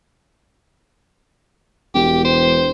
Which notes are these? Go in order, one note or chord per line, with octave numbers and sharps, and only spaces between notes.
E1 G4
C5